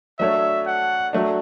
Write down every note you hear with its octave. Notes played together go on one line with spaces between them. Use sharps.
F#3 A3 D4 A4 C#5 E5
F#5
F#3 A3 D4